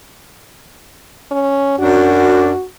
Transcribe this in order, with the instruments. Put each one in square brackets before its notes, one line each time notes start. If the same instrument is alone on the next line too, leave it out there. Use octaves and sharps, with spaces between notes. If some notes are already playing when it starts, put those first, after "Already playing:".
[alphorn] C#4
[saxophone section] F#2 D4 [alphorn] F#4